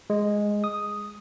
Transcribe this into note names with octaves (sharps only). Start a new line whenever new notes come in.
G#3
D#6